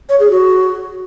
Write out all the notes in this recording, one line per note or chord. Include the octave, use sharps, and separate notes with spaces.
C#5
G#4
F#4